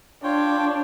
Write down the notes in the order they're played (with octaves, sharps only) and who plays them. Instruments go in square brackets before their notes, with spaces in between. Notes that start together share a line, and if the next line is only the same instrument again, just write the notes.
[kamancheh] D4 [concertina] F4 C#5 G5